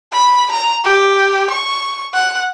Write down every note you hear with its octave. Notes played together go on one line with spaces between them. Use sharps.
B5
A#5
G4
C#6
F#5